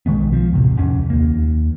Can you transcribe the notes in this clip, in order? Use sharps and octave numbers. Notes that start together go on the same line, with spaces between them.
B1 D#3 G#3 B3
F3
D#1 A1 C3
C2 F2 C#4
D#2 A#3